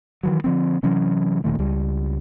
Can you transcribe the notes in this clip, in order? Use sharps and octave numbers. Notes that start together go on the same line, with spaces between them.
D#3 E3 F#3
D3 F3 C4
C3 E3 F#3 C#4
E1 A#2 D#3 A3
C#2 G3